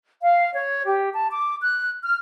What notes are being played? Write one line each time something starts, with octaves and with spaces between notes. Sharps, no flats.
F5
C#5
G4
A5
D6
F#6
F6